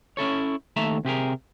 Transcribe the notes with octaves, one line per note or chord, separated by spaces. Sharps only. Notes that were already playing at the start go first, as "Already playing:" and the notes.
C#4 E4 A4 C#5
D#2 A3 E5 A5 A#5
C3 G4 G#4 A#4